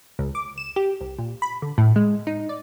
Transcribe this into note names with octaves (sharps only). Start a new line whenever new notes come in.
C#2
D6
E7
G4
C2
A#2
B5
D3
A2
G#3
D#4
D5